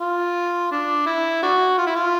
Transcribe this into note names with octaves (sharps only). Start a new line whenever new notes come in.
F4
D4
E4
D4 F#4
F4
E4
F4